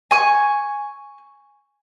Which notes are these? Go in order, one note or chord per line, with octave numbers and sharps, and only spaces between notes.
G#5 C#6